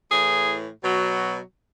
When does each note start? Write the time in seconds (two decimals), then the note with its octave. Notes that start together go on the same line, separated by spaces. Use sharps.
0.11 A2 E3 G#4
0.83 B2 F#3